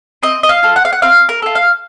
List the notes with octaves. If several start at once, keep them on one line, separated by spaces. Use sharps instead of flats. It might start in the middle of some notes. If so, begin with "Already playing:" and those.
C4 D#5
D#5
F5
F4 A4
F#5
F5
F#5
C4 F5
A#4
F4 A4
F5